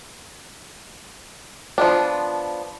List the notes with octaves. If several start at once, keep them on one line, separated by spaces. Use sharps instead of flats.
F3 B3 D4